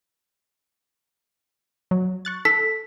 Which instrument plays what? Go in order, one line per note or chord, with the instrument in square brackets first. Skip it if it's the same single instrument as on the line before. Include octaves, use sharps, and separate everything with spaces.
[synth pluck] F#3
C#6 F#6 A6
[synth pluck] A4 [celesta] B6